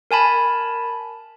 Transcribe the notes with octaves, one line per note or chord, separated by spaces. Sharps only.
A#4 G#5 A5 B5